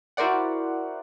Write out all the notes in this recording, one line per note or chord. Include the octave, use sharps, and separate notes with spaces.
E4 F#4 A#4 C5 D5 F#5